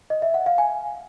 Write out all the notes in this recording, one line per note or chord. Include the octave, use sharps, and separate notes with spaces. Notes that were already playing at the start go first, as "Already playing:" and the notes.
D#5
E5
F#5
F5
G#5